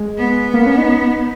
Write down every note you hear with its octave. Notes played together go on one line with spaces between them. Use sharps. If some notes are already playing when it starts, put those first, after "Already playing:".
Already playing: G#3
B3
A#3
C#4
D#4